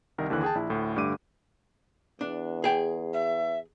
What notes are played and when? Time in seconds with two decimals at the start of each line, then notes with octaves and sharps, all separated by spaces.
0.18 C2 D#3 A#4
0.30 D#2 D3 E3 F#6
0.43 G#4 G5 A5
0.55 A#1 E4
0.70 D2 A2
0.96 G2 D3 A3 D6 D#7
2.21 E2 D4
2.64 G#4 G5
3.13 E5